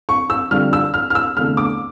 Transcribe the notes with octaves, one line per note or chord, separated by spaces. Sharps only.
C#6
E6
F2 D3 G3 D4 F4 F6
E6
F6
F6
E6
F1 E2 D3 A3 F6
D6